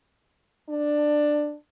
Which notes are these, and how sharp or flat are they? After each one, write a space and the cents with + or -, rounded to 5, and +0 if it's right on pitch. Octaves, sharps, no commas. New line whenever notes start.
D4 +10